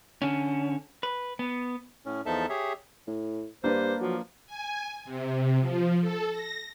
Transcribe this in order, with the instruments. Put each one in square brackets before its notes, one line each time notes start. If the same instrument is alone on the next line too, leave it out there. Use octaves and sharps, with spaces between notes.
[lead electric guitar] D3 C#4
B4
B3
[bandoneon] A2 C#4
E2 F3 D#4 A4 E5 A5
G4 G#4 C#5 E5
[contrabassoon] A2
[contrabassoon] G2 [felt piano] A#3 D4 B4 [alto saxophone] C5
[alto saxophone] F3 [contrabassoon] F#3
[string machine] G#5
C3
F3
A4
A#6